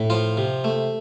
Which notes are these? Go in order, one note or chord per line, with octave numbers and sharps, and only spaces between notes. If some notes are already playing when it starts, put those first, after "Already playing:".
Already playing: A2
F3 F4
C3
A3